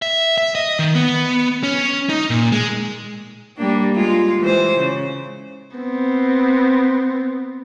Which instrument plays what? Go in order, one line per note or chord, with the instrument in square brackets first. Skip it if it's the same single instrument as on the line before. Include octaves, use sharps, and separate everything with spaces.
[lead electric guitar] E5
E5
D#5
D#3
B3
C#4
D#4
A#2
G#3
[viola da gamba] G3 A#3 D4
G#3 F4
E3 G#3 C5
C#3
[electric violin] B3 C4